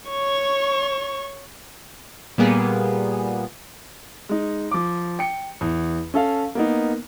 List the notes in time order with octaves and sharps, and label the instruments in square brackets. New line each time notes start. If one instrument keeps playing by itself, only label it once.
[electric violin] C#5 C#6
[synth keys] A#2 G3 A#3 B3 G#4
[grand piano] G#3 D#4
F3 D6
G5 C#7
E2
C#4 A4 F5
A#3 B3 D#4